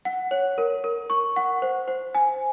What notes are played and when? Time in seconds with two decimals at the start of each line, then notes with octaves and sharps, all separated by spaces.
0.05 F#5
0.31 C#5
0.58 A#4
0.84 A#4
1.10 C#6
1.36 F#5
1.62 C5
1.88 C5
2.15 G#5